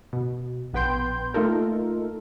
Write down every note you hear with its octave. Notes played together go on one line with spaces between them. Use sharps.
B2
A#1 B3 B4 G5 C6 G6
A3 A#3 D#4 F4 A4 A#4